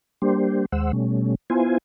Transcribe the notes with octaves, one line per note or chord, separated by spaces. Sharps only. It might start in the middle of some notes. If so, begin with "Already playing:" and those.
G3 A#3 D4 G4 C5
D#2 G#3 C5 F#5 E6
B2 G3 A3 C#4
B3 E4 F4 C5 G#5